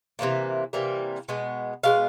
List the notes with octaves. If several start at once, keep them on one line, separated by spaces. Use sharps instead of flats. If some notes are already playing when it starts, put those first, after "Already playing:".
C3 E3 G3 A#3
C3 E3 G3 A#3
B2 G#3 B3
B2 G#3 B3 F5